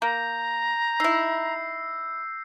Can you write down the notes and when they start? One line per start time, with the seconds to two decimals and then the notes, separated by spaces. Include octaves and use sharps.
0.02 A#3 A#5 G6
1.00 D#4 E4 E6 A#6 C7